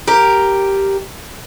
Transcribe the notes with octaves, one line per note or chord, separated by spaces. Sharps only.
G4 A#4